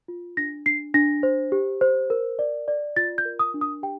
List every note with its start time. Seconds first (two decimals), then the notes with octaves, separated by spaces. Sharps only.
0.08 F4
0.37 D4 A#6
0.66 D4 C7
0.94 D4 A#6
1.23 C5
1.52 G4
1.81 C5
2.10 A#4
2.39 D5
2.68 D5
2.96 F4 A6
3.18 G6
3.25 A#4
3.39 D#6
3.54 D4
3.61 D#6
3.83 G4 G5